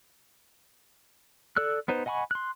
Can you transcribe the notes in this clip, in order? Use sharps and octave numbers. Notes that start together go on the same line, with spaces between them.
A4 D5 E6 F#6
B3 D#4 B4 C5
D#5 F#5 G#5 B5 C#6
C6 F#6